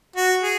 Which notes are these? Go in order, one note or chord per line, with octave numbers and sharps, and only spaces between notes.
F#4
G#4